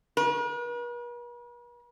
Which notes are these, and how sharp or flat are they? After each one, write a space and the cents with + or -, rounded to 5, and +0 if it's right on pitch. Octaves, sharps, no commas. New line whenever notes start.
B4 -45